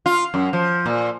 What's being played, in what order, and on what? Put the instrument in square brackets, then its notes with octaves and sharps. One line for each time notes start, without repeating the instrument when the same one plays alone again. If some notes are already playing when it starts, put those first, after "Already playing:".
[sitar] F4
F#2
F3
A#2